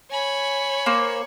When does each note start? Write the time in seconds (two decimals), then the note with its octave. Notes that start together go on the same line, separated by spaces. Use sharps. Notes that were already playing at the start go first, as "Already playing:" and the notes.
0.11 C#5 G#5 B5
0.86 A#3 C5